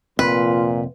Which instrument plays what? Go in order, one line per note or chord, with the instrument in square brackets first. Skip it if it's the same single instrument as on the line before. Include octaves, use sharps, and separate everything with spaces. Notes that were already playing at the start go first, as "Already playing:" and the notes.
[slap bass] F1 C4 [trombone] A#2 [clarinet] F4 [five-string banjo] B4